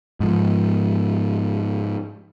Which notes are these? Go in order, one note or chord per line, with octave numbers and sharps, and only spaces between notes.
G#2 F3